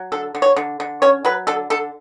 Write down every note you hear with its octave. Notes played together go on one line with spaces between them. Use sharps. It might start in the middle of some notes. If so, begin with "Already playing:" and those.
Already playing: F#3
D3 A4
D3
C#5
D3
D3
C#4 C#5
F#3 B4
D3 A4
D3 A4